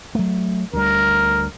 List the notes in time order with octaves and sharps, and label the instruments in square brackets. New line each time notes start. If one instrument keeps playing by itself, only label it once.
[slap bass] F#3 A3
[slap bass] D2 G3 [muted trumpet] A#4